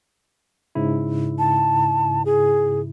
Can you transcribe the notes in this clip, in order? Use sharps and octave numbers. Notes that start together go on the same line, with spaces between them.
G#2 C#3 E4
A5
G#4